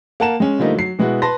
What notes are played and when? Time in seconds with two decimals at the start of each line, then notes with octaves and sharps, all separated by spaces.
0.20 A#3 F#5 A5 A#5 E7
0.40 G#3 C#4
0.59 D3 F3 G3 A3 A#3 D#4
0.75 F#3 C7
0.99 B2 G#3 B3 E4 F#4
1.22 B4 A5 C6 A#6